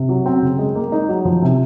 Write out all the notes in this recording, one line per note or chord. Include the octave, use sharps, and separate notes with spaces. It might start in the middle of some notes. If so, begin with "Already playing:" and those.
Already playing: C3
F#3
C4
C#3
G#3
A#3
D#4
F#3
F3
C3